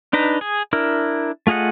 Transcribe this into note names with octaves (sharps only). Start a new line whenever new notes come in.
D4 D#4 B4 A#5
G#4
D4 E4 A#4
A3 F4 G#4 D#5 F#5